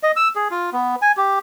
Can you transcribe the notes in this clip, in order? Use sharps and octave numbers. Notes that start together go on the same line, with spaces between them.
D#5
E6
G#4
F4
B3
G#5
G4